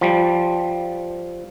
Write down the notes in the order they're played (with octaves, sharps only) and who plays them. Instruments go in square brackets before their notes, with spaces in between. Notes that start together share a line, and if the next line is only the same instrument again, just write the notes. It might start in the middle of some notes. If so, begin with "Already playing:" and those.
[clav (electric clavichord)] F3 G3